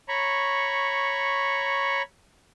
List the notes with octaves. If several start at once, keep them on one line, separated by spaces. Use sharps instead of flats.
C#5 A#5 B5 C#6